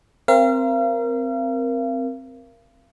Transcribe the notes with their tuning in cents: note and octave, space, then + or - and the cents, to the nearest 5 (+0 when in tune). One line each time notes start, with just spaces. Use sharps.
C4 +0 A#4 +10 F5 -35